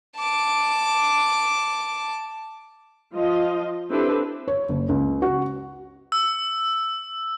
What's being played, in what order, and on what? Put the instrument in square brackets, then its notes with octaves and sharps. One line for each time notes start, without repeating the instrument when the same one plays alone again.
[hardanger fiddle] A5 D6
[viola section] F3 F4 D#5
C4 D4 E4 G4 A4 B4
[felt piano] C#5
F#1
C#2
F#4
[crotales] E6